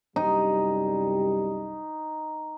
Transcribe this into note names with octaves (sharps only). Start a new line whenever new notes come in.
C2 F#2 G3 D#4